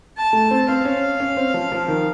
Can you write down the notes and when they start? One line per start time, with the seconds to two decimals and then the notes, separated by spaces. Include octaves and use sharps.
0.17 A5
0.33 A3
0.51 C4
0.68 C4 F5
0.85 C#4
1.20 C#4
1.37 C4
1.54 F3
1.72 F3
1.88 D#3